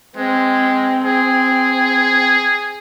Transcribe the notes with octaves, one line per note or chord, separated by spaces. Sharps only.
G#3 C4
G#4